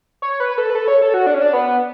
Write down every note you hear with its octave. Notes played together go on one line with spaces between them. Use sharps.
C#5
B4
A4
B4
A4
C#5
A4
F#4
D4
C#4
D4
B3